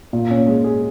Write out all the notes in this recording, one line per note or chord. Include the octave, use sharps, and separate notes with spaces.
A#2
C#4
G#3
G#4